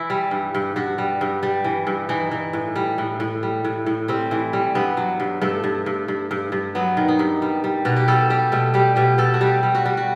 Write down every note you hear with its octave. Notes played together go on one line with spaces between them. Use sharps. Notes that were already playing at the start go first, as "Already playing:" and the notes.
Already playing: E3 E4
G3
G2
G2
G2 F#4
G3
G2
G3
E3
G2
E3 D#4
E3
A2
G3
A2
A2
G3
A2
A2
G3 C4
E3
G3
G2 B3
F#3
G2
G2 A3
G2
G2
G2
G2
G2
F#3 B3
D#3
D#4
G2
G3
G3
B2 F#4
G4
G3 A4
G3 G4
B2 A3
G3 G4
B2 G4
B2 A4
F#4
G3 G4
G3
F#4
G3
F#4